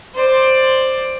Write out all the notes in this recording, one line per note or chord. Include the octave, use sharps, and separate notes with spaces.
C5 D5